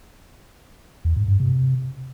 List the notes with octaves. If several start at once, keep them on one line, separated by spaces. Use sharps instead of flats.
E2
G#2
G2
C3